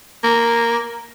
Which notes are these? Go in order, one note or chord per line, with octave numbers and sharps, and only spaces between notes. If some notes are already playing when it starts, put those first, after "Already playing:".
A#3